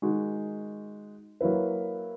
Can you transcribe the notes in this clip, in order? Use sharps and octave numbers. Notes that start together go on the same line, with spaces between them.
D#3 G#3 D#4 F#4
F#3 A#3 E4 B4